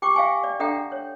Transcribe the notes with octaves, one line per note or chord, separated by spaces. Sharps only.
G4 G5 C#6 D6
E5 F5 G5 G#5 C#6
D5
D4 A4 E5 F#5 G5 A#5
C#5